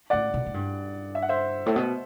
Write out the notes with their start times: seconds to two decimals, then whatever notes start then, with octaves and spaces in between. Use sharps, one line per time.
0.10 A2 D5 F#5
0.34 B2
0.47 A2
0.54 G2
1.15 E5
1.22 F#5
1.29 C5 E5
1.66 A2
1.76 B2